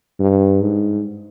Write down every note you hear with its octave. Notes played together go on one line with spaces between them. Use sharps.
G2
G#2